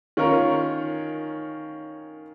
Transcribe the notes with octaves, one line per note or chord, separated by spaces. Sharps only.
D#3 C#4 F4 A#4 C#5